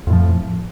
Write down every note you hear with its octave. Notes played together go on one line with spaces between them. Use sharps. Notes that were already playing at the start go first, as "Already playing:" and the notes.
F2 A2 F3